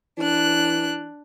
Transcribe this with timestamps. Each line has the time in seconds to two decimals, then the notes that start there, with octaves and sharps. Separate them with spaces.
0.18 E3 D4 F#6